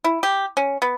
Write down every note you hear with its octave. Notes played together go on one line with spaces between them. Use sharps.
E4
G4
C#4
B3